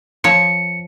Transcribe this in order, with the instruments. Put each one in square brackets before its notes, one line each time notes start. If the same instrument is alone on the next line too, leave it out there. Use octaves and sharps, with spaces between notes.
[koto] F3 C#5 [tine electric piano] C#7